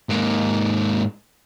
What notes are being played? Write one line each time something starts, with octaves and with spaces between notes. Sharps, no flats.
G#2 A#3